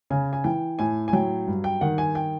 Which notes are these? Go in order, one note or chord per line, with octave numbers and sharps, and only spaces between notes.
C#3 G#5
G#5
E3 G5
A2 G#5
G#5
F#3 G5
G2
G5
D#3 F#5
G#5
G5